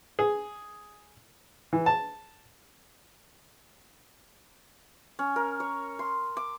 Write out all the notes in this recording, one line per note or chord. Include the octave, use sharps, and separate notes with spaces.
G#4
E3
A5
C#4
A#4
C#5
C6
D6